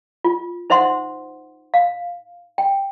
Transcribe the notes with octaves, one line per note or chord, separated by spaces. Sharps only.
F4
D#4 C5 E5 F#5 C6
F5
G5